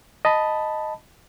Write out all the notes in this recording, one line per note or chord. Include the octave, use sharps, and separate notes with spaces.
D#5 A5 B5